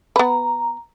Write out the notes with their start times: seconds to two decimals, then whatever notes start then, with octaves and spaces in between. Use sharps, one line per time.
0.16 B3 B4 A#5